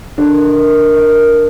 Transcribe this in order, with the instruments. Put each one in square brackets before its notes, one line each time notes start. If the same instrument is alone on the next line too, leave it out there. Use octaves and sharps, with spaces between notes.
[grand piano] D3 D4 [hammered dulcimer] D#3
[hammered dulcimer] D#3
D#3
D#3